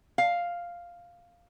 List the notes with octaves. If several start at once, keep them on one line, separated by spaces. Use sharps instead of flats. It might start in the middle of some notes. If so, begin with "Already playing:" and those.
F5